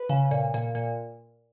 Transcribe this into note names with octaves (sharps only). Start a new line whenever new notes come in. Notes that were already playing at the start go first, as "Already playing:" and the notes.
Already playing: B4
C#3
A#2
A#2
A#2